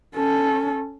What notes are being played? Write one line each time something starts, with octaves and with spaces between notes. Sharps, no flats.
C#4 A4